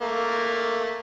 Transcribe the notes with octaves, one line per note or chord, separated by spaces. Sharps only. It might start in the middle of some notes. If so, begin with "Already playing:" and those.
A3 A#3